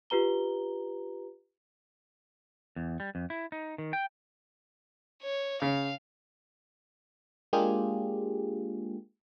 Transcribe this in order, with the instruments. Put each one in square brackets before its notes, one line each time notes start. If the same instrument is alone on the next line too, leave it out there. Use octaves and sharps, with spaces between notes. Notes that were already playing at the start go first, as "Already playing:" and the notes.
[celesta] F4 G4 B4 A#5 G7
[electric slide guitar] E2
G3
F2
E4
D#4
D#3
G5
[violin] C#5
[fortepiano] C#3 [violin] F5
[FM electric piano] G#3 A#3 D4 F4 G4 G#4